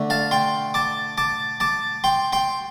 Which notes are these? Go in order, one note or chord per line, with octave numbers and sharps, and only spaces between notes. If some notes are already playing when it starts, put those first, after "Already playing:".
Already playing: D3 A3 D4
F5 A5
G5 C6
A5 D6
A5 D6
A5 D6
G5 C6
G5 C6